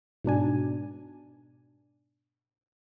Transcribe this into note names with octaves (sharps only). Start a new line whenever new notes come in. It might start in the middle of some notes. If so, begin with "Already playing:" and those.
G#2 B2 D4 G#5